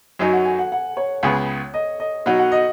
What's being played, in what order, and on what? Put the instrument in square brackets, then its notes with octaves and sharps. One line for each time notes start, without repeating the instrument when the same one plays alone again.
[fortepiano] F#2 F#3 D#4 [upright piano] G#5
[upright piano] F#5
G#5
F#5
F#5
C#5
[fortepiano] C#2 C#3 B3 G#4
[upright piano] D#5
D#5
[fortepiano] B2 F#3 D#4 [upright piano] F#5
[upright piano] F#5
D#5